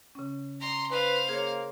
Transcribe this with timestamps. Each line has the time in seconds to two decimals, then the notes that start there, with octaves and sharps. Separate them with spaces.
0.15 C#3 C#4
0.60 A#5 C6
0.91 B4 C5 F5
1.29 A#3 G#4 C#5